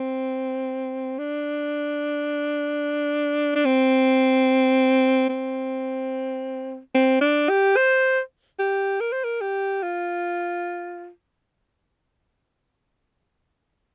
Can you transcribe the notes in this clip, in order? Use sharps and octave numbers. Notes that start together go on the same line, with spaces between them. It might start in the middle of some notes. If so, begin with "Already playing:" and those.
Already playing: C4
D4
D4
C4
C4
C4
D4
G4
C5
G4
A#4
C5
A#4
G4
F4